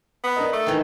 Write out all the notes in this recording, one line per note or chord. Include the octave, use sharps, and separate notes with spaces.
B3
D4 A#4 D#5
A3
D#3 E3